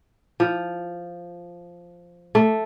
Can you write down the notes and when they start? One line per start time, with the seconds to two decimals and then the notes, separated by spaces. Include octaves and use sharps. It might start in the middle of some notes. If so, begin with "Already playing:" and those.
0.40 F3
2.35 A3